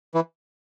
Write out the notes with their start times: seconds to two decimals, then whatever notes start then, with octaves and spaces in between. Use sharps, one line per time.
0.14 E3